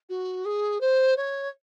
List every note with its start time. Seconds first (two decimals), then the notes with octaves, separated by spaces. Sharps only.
0.09 F#4
0.45 G#4
0.80 C5
1.17 C#5